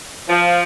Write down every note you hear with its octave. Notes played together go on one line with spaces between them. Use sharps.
F3